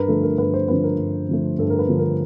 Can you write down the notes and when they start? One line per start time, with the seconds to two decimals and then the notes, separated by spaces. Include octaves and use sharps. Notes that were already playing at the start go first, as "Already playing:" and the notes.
Already playing: G2 A#4 B4
0.08 D3 F3 A3 A4
0.23 A#4
0.38 G2 B4
0.54 C5
0.68 D3 F3 A3 B4
0.84 A#4
0.99 G2
1.29 D3 F3 A3
1.59 G2 A4
1.70 A#4
1.79 B4
1.89 D3 F3 A3
1.99 A#4